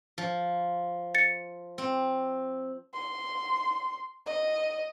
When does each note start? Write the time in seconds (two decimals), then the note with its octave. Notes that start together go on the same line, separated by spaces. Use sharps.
0.18 F3
1.15 A6 C#7
1.78 C4
2.94 C6
4.26 D#5